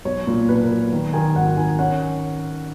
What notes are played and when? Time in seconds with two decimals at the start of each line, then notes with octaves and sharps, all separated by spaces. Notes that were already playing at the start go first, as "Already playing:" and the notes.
0.05 B1 C#5
0.27 A#2
0.48 B1 B4
0.63 A#4
0.70 B1
0.93 D#3
1.13 D#3 G#5
1.36 G#1 F#5
1.57 D#3 G#5
1.79 C#4 F#5